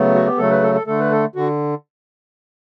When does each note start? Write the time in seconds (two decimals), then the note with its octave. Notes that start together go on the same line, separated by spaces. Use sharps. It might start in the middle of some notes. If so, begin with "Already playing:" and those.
Already playing: C#3 F#3 A3 B3
0.15 F#4
0.26 G4
0.38 C#3 F#3 A3 A4
0.50 B4
0.63 A4
0.75 A4
0.87 D3 A3 A4
1.00 B4
1.12 A4
1.35 D3 F#4